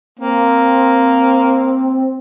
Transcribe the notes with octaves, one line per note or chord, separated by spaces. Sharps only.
A#3 C4